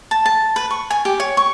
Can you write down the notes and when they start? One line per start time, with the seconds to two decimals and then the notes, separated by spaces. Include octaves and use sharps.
0.11 A5
0.26 A5
0.56 B4
0.71 C#6
0.90 G#5
1.05 G4
1.20 C#5
1.37 C#6